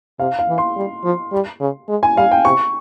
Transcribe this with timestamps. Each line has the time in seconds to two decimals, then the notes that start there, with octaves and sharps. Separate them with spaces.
0.19 C3 F5
0.39 F5
0.48 E3
0.58 C6
0.76 G3
1.04 F3
1.32 G3
1.61 C#3
1.89 G#3
2.03 G#5
2.17 G3 F5
2.31 G5
2.45 C3 C#6